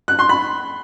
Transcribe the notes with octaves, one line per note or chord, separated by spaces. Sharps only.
F#6
C6
B5